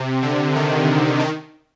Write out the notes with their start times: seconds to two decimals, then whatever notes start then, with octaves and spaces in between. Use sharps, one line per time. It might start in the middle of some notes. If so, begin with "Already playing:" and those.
Already playing: C3
0.22 D3
0.56 D#3
1.20 D#3